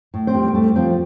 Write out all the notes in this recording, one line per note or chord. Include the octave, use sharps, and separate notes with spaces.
A2
C4 C5
G3
C5
A2 A3 A4
F3 C4 C5